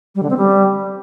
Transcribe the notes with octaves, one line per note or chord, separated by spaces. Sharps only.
G3
D3
C4
G3